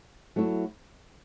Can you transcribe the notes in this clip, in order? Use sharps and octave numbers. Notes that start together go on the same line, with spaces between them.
F#3 A3 E4